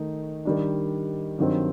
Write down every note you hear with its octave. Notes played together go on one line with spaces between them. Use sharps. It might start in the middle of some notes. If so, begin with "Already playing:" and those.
Already playing: D#3 A3 D#4
D#3 G3 D4
G2 D#3 F#3 C4